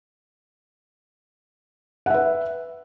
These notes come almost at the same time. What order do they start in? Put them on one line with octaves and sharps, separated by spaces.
F#5 E5 B4